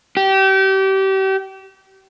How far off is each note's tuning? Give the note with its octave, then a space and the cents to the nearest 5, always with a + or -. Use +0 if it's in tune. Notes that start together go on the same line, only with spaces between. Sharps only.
G4 -30